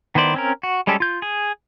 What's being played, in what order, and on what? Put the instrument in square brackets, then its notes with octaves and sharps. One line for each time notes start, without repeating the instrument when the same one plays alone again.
[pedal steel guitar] D#3 B3 E4 C5 D5
C4 C#4 A#4
F#4
G3 G#3 C#4 G4 A4
F4 G6
G#4